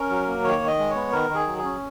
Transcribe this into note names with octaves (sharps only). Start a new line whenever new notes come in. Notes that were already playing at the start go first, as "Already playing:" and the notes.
Already playing: C#4 A#4
F#3
A#3
D#3 C#5
D#3
D#5
G#3
C#5
B3
D#3 A#4
D#3 G#4
F#3
G#4
C#4